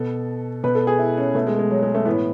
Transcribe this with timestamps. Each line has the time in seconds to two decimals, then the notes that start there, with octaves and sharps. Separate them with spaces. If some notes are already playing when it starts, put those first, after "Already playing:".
Already playing: B2 A4
0.64 B2 B4
0.75 A4
0.87 G#4
0.99 E4
1.17 C#4
1.35 B2 A3
1.47 G#3
1.59 G#3
1.71 F#3
1.83 G#3
1.95 A3
2.06 A2 E3 B3